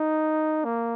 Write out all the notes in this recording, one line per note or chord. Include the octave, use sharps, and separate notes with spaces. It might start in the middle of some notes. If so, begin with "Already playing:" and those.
Already playing: D#4
A#3